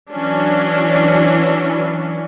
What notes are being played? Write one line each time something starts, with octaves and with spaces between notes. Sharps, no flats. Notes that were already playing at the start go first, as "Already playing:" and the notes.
E3 F#3 C#4 D4